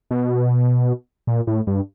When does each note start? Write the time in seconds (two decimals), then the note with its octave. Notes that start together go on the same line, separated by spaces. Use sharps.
0.11 B2
1.27 A#2
1.47 A2
1.67 G2